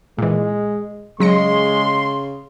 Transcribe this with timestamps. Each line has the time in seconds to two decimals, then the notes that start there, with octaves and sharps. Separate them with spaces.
0.18 A#2 E3 G#3
1.20 C#3 F#3 G#3 C6 A#6 C#7